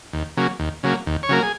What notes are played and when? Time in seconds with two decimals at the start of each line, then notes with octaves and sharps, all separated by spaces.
0.13 D#2
0.37 C#3 F#3 A#3
0.59 D#2
0.83 C#3 F#3 A#3
1.06 D#2
1.23 C#5
1.29 C#3 F#3 A#3 A#4
1.42 G#4